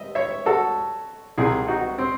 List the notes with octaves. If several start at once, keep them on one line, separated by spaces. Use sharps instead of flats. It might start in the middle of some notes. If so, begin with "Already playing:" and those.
Already playing: D#5 E5
C#5 E5
F#4 A4
C2 C3 D#3 E4 G#4
D#4 F#4
C4